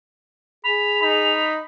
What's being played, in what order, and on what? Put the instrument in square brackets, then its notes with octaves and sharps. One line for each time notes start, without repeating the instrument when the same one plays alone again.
[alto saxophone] G#4 [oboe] B5 [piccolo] F7
[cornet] D#4 [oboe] B5